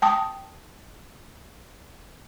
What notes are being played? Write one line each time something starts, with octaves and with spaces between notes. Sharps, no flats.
G5 A5 D#6